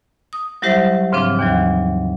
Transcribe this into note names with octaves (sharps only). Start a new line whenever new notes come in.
D#6
F#3 G3 E4 G4 C5 E5
G#2 C#3 F3 C4 D4
D#2 E3 F#3